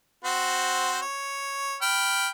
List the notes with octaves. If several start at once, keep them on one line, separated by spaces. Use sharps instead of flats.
C4 F#4 C5
C#5
G5 B5 F6